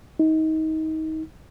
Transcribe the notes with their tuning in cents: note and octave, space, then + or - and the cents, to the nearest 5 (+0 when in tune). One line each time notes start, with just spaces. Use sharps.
D#4 +25